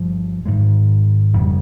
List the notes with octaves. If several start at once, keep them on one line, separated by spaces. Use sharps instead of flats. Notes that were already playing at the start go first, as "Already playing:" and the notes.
Already playing: G1 G2 F3
G#2 D#3 G#3
G1 F2 C#3 G3